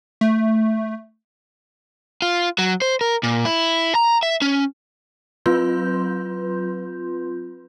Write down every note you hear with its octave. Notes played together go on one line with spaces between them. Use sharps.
A3
F4
F#3
C5
A#4
A#2
E4
A#5
E5
C#4
F#3 C4 F4 B4 C6 G6